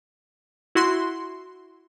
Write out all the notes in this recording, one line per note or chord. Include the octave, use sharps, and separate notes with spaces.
E4 F#4 C6